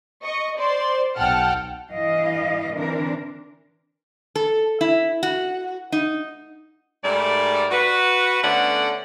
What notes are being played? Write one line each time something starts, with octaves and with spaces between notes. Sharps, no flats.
D#5 C#6
C5 D5 C6
B1 F#5 G5 A5 F6
G2 E3 E4 D#5 F5
D3 E3 C4 D4 A#4
A4
E4
F#4
D#4
G#2 G3 A3 A#4 D5
F#4 B4
D3 A3 B3 C#4 D5 F#5